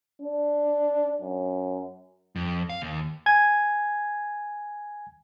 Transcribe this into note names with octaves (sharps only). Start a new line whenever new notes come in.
D4
F#2
F2
F5
D#2
G#5 G#6